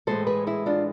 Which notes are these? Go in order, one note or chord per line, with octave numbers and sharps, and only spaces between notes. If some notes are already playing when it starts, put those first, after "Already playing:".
A2 E3 G#3 A4 C5
G#4 B4
E4 G#4
D4 F4